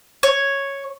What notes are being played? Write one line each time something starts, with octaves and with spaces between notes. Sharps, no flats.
C#5